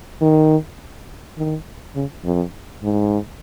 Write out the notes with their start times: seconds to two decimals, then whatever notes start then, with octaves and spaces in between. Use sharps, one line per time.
0.21 D#3
1.37 D#3
1.95 C#3
2.25 F2
2.83 G#2